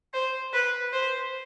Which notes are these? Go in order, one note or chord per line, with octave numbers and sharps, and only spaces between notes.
C5
B4
C5